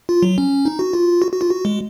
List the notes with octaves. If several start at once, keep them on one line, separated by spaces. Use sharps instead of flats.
F4
F#3
C#4
D#4
F#4
F4
F#4
F#4
F4
F#4
G#3